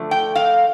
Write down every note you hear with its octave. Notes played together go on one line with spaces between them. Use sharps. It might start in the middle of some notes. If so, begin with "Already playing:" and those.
Already playing: D3 F3 A3
G5
F5